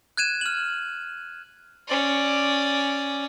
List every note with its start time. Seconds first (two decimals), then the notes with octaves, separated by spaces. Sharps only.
0.17 F#6 G#6 D#7 E7
0.41 F6 F#7
1.88 C#4 D5